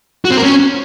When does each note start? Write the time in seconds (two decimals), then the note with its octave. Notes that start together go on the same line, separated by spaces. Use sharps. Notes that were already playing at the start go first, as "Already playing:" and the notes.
0.25 F#4
0.31 C4
0.37 A#4
0.43 C#4